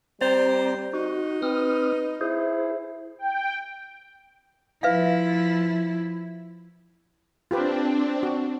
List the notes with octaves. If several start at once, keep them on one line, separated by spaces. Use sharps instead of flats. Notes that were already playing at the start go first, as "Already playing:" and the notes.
G3 C4 C5 D5 A#5
D#4 F#4
C4 B4 D#6 F6
E4 G#4 C5
G5
F3 E4 B4 E5 F5
C4 D4 F4 G4 B4
F#4